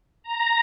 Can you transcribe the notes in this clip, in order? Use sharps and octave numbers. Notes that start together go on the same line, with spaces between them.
A#5